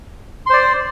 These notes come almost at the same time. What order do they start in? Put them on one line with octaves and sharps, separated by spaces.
C6 C5 D5